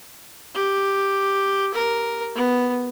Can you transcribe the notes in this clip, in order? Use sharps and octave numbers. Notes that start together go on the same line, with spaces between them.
G4
A#4
B3